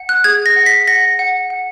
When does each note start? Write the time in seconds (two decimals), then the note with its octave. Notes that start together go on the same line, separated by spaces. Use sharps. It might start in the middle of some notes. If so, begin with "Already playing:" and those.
Already playing: F#5
0.09 F#6
0.24 G#4 G#6
0.46 A#6
0.56 F#5
0.66 B6
0.88 F#5 A#6
1.19 F#5
1.50 F#5